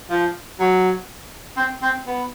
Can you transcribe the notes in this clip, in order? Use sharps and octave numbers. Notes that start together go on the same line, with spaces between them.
F3
F#3
C4
C4
B3